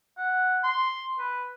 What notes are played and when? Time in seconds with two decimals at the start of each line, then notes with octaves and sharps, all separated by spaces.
0.17 F#5
0.64 C6
1.19 B4